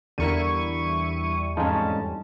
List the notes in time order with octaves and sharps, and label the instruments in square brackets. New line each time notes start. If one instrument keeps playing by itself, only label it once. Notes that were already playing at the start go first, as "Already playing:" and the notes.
[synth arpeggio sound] E2 G3 [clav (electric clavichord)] D3 A#4 [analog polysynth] E4 C#6 D#7
[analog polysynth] F2 G#2 C#4 [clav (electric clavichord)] G#3 D#4 F4 [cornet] A5